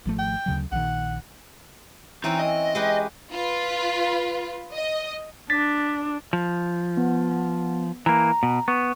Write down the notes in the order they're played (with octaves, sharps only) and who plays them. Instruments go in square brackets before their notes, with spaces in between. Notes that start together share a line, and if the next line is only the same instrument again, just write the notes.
[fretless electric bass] G#1 F3 A3
[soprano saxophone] G5
[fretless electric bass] D2 C#3 F#3
[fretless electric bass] A#1 D#3 [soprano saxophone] F#5
[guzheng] E3 C4 C#4 [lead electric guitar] D#4
[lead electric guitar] D#5
[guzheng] G#3 G4 B4
[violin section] F4 B4
D#5
[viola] D4 [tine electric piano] A6 B6
[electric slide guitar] F3
[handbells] B3
[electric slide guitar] E3 A#3 [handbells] A#5
[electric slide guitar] B2
[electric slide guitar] B3 [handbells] C#6